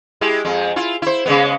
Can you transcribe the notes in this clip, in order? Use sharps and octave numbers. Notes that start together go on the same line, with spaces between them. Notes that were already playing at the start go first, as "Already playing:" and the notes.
G#3 E4 G4
F2 G#3
E4 F4
E4 C5
C#3 G#3 B3